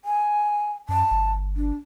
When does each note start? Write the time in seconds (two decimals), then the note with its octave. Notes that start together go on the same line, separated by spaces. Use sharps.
0.05 G#5
0.89 F#2 A5
1.11 G1
1.56 D4